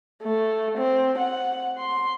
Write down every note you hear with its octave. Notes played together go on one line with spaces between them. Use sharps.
A3
C4
F#5
C6